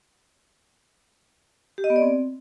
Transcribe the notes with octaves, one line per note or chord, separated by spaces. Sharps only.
G4
D#5
B3
D5
C4